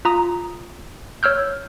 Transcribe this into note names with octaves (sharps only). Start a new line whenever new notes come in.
F4 A#5 D#6
C#5 E6 F6 G6